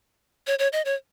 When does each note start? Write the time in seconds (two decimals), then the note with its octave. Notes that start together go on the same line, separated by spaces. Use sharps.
0.47 C#5
0.59 C#5
0.73 D#5
0.85 C#5